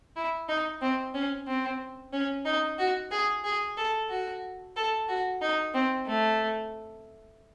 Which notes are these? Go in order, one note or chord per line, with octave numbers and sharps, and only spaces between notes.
E4
D#4
C4
C#4
C4
C#4
D#4
F#4
G#4
G#4
A4
F#4
A4
F#4
D#4
C4
A3